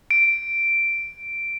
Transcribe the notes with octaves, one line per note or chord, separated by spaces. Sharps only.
D7